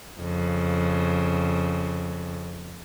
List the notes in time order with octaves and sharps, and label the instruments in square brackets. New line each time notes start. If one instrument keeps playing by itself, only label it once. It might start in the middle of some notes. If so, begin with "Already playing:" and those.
[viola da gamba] F2 C#3